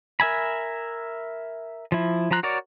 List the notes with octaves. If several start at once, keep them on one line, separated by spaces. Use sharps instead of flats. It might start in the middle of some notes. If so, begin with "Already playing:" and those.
A#4 E5 G#5 B5
F3 E4
F3 F4 A#5 F#6
F#4 A#4 C#5 D5